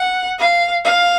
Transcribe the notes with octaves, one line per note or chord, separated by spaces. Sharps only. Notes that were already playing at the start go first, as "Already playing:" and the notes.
Already playing: F#5
F5
F5